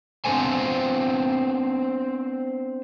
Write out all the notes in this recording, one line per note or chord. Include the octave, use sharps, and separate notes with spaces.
B3 C4 D4 A4 C5 G#5